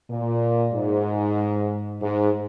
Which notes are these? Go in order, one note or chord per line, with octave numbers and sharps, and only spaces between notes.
A#2
G#2
G#2